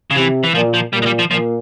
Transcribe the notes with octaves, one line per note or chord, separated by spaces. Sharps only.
C#3
C3 E3
E3
A#2 F3
F3
A#2 G3
G#3
G3
F3
A#2 F3